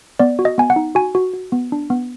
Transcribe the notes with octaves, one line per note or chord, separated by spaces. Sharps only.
B3 D5
F#4
D#5
B3 G#5
F#5
D#4
F#4 G#5
F#4
F#4
B3
D4
B3